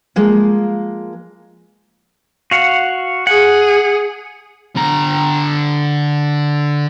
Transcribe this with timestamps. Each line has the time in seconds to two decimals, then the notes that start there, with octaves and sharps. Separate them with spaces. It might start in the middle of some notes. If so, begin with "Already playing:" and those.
0.16 F3 G#3 A#3
2.51 F#4 F5 F#5
3.27 G#4 F#5
4.76 D3 A#5